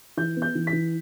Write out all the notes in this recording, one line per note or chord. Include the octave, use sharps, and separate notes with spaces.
E3 G6
B3
G6
E3
B6
E3